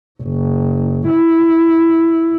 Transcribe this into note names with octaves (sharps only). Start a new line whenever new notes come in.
F#1
E4